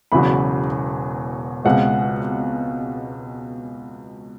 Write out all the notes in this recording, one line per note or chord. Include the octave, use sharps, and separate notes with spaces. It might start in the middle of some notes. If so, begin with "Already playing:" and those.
E1 E2 C#3 F#3 B5
C#2 B2 G#3 C4 F#5